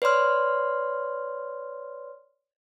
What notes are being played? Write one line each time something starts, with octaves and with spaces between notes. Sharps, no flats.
B4 C#5 D5 C6 F6